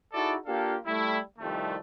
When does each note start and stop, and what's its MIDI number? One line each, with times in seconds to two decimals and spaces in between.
0.13 0.35 63
0.13 0.35 64
0.13 0.35 66
0.13 0.35 68
0.13 0.35 69
0.13 0.35 74
0.46 0.75 58
0.46 0.75 62
0.46 0.75 65
0.46 0.75 67
0.46 0.75 69
0.46 0.75 77
0.85 1.18 55
0.85 1.18 57
0.85 1.18 64
1.39 1.77 36
1.39 1.77 41
1.39 1.77 51
1.39 1.77 55
1.39 1.77 57